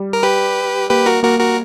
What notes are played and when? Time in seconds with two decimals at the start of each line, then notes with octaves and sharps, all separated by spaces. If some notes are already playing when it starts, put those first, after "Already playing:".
Already playing: G3
0.13 A#4
0.23 G4 B4
0.89 A#3 G4 B4
1.06 F#4 A#4
1.23 A#3 F#4 A#4
1.39 F#4 A#4